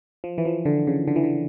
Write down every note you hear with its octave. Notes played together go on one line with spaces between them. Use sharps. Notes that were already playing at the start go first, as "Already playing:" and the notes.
F3
E3
F3
D3
C#3
D3
E3
D3